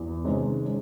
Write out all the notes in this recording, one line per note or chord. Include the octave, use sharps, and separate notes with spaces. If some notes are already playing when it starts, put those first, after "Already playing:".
Already playing: E2
C3 D#3 G#3 C#4
G#3 C#4